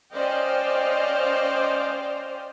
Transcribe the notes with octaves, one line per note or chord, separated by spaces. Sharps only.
C#4 C5 D5 D#5 F5 G5